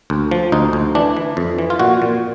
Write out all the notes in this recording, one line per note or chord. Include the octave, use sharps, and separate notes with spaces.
D2
F3
D2 D#4
D2
E3 D4
E3
F2
E3
F4
A#2 F#4
A#2